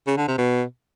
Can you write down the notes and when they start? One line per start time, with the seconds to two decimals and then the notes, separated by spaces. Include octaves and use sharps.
0.07 C#3
0.17 D3
0.28 C3
0.38 B2